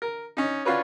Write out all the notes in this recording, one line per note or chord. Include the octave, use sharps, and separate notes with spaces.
A#4
C#4 D#4
C#4 D4 F4 F#4 B4 C#5